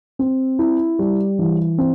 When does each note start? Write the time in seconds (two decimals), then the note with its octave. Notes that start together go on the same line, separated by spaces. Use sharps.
0.19 C4
0.59 E4
0.99 G3
1.39 E3
1.78 C4